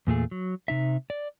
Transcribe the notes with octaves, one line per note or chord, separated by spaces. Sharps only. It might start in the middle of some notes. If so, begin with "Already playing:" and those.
E2 A#2 A3 G#4
F#3
C3 D#4 E5
D5